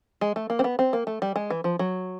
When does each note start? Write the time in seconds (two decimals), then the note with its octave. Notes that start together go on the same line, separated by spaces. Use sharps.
0.21 G#3
0.36 A3
0.50 A#3
0.59 C4
0.64 B3
0.79 C4
0.93 A#3
1.07 A3
1.22 G3
1.36 G#3
1.50 E3
1.64 F3
1.79 F#3